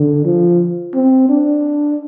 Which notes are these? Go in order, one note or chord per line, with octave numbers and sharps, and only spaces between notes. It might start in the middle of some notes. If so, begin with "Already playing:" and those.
Already playing: D3
F3
C4
D4